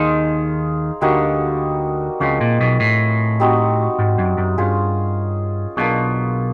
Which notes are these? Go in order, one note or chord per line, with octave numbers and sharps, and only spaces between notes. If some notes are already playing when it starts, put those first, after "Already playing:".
Already playing: D#2 D#3 D#4 G#4 C5 F5
D2 D3 G3 A#3 D#4 F#4
C#2 C#3 F3 G#3 C4
A#2
B1 B2
A2
G3 C4 D#4 F#4
G#2
F#2
F#2
G2 C#4 F4 G#4
B1 B2 A#3 D4 F4 G#4